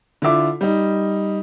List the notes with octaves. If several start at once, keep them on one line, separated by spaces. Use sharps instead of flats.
D3 E4 F4 E5 D6
G3 D#4